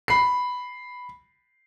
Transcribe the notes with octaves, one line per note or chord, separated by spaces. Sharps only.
B5 C7